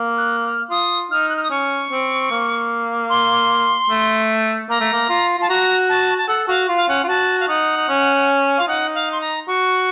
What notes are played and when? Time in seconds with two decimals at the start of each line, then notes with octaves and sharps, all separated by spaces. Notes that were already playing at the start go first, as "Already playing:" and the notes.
Already playing: A#3
0.18 F#6
0.44 F6
0.70 F4 D#6
1.11 D#4 F6
1.29 F#6
1.36 F6
1.44 D#6
1.50 C#4 C#6
1.91 C4
2.31 A#3
3.10 C6
3.90 A3
4.69 A#3 A#5
4.81 A3
4.93 A#3
5.09 F4
5.38 F4 A5
5.49 F#4 A#5
5.89 A5
6.18 A5
6.28 A4 F#5
6.48 F#4 F5
6.69 F4
6.77 F5
6.88 C#4 F#5
7.04 F4
7.08 F#4 A5
7.40 F5
7.48 D#4 F#5
7.77 D#4
7.89 C#4
8.57 F4 F5
8.67 D#4 F#5
8.95 F5
9.12 C6
9.21 A#5
9.47 F#4 C#6